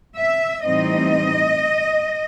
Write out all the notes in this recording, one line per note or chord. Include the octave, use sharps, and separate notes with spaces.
E5
A2 E3 G3 C4 D#4 D#5